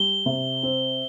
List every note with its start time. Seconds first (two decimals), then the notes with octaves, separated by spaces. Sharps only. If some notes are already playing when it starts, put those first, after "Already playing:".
Already playing: G3 G7
0.26 C3
0.63 C4